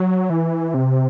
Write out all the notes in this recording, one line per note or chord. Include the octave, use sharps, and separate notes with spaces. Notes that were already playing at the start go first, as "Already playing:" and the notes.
Already playing: F#3
E3
C3